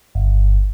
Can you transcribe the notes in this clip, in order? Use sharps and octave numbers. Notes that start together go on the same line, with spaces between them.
G1